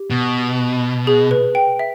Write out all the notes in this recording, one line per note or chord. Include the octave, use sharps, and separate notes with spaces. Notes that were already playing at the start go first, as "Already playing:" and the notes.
Already playing: G4
B2
G#4
B4
G5
E5